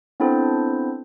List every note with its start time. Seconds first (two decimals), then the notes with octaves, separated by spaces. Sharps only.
0.20 B3 C4 D4 E4 A4 C5